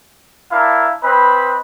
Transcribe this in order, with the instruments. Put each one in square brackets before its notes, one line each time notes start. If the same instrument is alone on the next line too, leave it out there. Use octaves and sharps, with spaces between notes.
[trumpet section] D4 E4 A#4 F5
C4 B4 D#5 B5